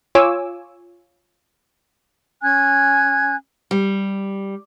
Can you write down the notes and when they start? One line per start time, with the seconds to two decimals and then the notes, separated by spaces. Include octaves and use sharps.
0.15 F4 C#5 G#5 D6 E6
2.42 C#4 G#5 F#6 G#6
3.71 G3